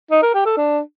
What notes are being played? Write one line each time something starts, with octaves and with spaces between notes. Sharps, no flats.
D#4
A#4
G4
A4
D4